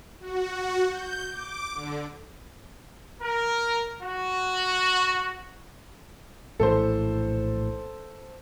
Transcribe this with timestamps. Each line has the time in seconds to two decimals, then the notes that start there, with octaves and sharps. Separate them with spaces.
0.20 F#4
0.52 F#4
0.89 G6
1.30 D6
1.75 D3
3.20 A#4
4.02 F#4
6.60 A#1 A2 E3 A4 C5